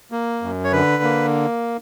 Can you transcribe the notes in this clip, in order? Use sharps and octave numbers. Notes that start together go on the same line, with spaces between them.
A#3
F#2
C#5
D3 B4
A#3